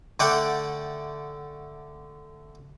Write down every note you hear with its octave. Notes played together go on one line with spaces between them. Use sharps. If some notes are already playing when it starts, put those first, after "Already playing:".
D3 A3 D5 F#5 G5